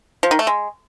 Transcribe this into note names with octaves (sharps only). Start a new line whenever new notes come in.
F3
D#3
A3
G#3